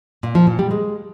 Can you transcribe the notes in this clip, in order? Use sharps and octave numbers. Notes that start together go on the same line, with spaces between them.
A#2
F3
A#2
G3
G#3